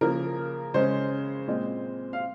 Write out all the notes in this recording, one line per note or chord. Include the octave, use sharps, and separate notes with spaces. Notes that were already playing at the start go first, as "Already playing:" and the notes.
C#3 F3 A#3 A#4
C#3 G#3 C#4 C5
A#2 G#3 C4
F5